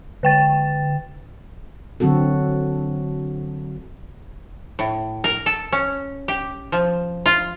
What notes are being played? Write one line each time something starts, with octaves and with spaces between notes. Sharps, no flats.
D3 G5 A6
D3 F#3 C4 F#4 A4
A2
A#4
A4
C#4
G4
F3
F4